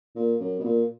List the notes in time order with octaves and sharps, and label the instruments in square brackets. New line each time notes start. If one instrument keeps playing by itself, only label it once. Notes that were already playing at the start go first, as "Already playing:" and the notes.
[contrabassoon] A#2
F#2
B2
A#2